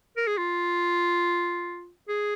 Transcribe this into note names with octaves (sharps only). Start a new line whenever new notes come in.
A#4
G#4
F4
G#4